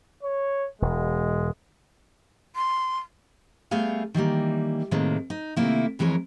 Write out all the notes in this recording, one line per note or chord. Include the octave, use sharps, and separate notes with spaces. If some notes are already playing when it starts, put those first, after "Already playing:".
C#5
E1 G#3
C6
G3 A3 B3 G#4 F5
D#3 E3 G3 A#3
A2 C3 D#3 G#3 A#3
D#4
C3 D#3 A3 A#3 E4
F2 E3 G#3 A#4 C#5